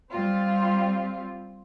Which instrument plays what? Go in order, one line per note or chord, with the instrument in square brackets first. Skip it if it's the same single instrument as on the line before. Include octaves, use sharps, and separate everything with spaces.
[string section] G3 C4 F4